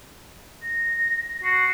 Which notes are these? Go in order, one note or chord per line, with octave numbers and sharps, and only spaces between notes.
A#6
F#4 C7